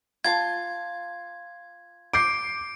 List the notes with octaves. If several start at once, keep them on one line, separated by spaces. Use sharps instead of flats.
F4 A5 G#6
D6 G6 C7 D7